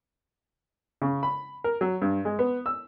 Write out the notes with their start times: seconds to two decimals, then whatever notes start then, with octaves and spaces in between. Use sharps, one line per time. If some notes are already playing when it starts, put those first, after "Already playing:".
1.02 C#3
1.23 B5
1.64 A#4
1.81 F#3
2.02 G2
2.25 G#3
2.39 B3
2.66 E6